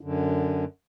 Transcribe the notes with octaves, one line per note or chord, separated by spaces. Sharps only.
F#2 D3